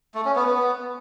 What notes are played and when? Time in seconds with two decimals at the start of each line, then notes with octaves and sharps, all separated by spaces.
0.15 A3
0.25 C#4
0.36 B3
0.46 B3